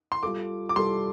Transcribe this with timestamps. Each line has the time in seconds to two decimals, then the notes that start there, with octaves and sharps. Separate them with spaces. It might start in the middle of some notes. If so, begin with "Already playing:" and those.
0.12 C6
0.23 G3 F4 A4 D6
0.69 D6
0.76 G3 F4 A4 C6